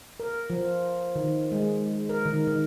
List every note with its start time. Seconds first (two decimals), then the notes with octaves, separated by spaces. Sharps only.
0.20 A#4
0.50 F3
1.16 D#3
1.52 G#3
2.09 A#4
2.26 D#3
2.47 D#3